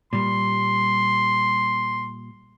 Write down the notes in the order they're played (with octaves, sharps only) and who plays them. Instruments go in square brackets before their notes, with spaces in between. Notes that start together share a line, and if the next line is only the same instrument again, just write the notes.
[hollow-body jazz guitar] A#2 G3 [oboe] C6